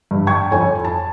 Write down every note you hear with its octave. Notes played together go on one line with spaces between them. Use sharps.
G2
G5 A5 C#6 G#6
F2 C#5 G#5
A5